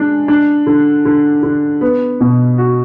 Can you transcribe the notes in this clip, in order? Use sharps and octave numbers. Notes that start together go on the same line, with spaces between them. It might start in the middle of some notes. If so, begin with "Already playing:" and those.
Already playing: G#3 D4
D4
D3
D3
D3
B3
B2
F#4